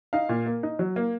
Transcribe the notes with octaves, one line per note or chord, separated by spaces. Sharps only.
D#4 F5
A#2
A#3
D#4
F#3
A#3